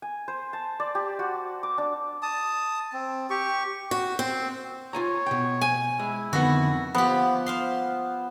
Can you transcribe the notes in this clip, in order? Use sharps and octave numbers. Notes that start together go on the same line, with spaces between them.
G#5
C5
A5
D5
G4
F#4
D6
D4
A5 D#6
C4
G4 C#6
F#4
C4
F4 C#5 G#5 A#5
B2 G5
G#5
G#3 E4
F2 D3 D#3 B3 F#4
F3 B3 G4
C5 F5 C6